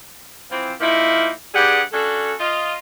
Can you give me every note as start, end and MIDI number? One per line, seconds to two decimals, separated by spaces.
0.51 0.74 52
0.51 0.74 53
0.51 0.74 60
0.80 1.29 53
0.80 1.29 58
0.80 1.29 63
0.80 1.29 64
1.55 1.80 43
1.55 1.80 55
1.55 1.80 67
1.55 1.80 68
1.55 1.80 78
1.92 2.32 61
1.92 2.32 62
1.92 2.32 66
1.92 2.32 69
2.39 2.75 65
2.39 2.75 75